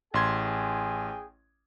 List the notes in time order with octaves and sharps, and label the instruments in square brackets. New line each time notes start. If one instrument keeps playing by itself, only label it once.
[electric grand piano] A1 C6 G#6 [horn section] G#4 G5 G#5